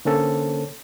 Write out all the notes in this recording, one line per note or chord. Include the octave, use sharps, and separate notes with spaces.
D3 A#3 C#4 A4 C5 C#5